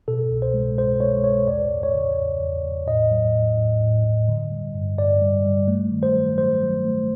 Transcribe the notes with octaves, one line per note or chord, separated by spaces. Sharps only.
B2 A4
C2
C5
G#3
C2 C5
G#3 C#5
C2 C#5
E2 D5
E2
C#5
C#3
E2
E2
E2
A2 D#5
F#3
A2
A2
A2
A2
D3
G3
G2
G2 D5
G3
G3
A3
D#3
C5
F#3
F#3 C5
F#3
A3